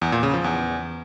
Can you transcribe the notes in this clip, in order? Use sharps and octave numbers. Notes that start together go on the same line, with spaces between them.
E2
A#2
C#3
F3
E2